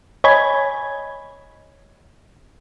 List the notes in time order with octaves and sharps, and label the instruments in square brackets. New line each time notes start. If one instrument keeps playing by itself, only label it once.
[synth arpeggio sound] C#5 D#5 G#5 B5 G#6